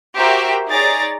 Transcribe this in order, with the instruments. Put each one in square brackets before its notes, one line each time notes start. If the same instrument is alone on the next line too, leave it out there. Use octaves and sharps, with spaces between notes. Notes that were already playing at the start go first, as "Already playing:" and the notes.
[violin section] F#4 G4 A#4 C5 E5 G5
D#4 G#4 C#5 D5 A#5 A6